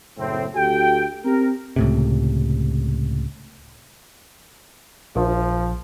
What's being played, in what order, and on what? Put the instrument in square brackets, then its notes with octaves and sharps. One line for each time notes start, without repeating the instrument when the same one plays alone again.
[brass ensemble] F#1 A2 C4
D2 F#4 G4 A4 G5
C4 G4 A#4
[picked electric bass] C#2 A2 C3
[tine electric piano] A#1 [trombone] F3